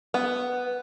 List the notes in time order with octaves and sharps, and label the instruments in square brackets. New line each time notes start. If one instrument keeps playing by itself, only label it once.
[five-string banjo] B3